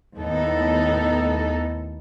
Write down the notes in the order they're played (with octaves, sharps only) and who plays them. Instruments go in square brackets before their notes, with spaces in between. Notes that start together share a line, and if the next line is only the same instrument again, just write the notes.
[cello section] D#2 A2 B3 D#4 A4